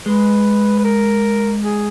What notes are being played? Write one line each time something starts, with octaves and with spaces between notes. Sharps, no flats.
G#3 B4
B4
A#4
G#4